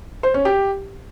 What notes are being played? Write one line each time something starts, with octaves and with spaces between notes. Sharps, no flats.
C5
C#4
G4